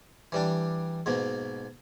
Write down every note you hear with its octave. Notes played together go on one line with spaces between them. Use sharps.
E3 G3 D4
G#2 B2 A#3